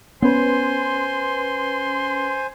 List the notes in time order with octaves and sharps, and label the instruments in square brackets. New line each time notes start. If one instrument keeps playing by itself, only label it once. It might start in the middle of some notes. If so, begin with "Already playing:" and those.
[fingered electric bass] B3 [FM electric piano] C#4 B4 [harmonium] C5 G#5 [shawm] C6